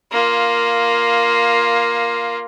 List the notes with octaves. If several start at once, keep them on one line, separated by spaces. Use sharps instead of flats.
A#3 F4